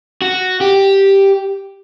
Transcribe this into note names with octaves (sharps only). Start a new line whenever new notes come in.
F#4
G4